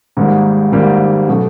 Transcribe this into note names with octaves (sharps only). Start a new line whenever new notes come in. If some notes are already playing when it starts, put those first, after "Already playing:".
G#1 G#2 D#3 G3 A#3
G#1 G#2 D#3 G3 A#3
B2 F#3 A3